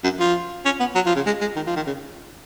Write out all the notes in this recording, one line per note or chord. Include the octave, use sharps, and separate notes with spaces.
F#2
F3
C#4
B3
F#3
F3
C#3
G#3
G#3
D#3
F3
D#3
C#3